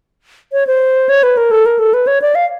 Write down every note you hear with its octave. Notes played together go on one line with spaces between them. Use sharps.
C#5
C5
C#5
B4
A#4
A4
A#4
A4
B4
C#5
D5
F5